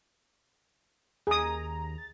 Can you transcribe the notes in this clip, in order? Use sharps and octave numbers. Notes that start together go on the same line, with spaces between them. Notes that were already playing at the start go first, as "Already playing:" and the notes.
D#2 G#4 A#5 D#6
A6